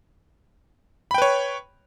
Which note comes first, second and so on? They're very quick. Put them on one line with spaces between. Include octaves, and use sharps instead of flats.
B5 G5 B4 C#5